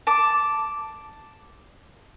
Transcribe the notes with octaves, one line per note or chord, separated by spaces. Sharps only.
A5 D6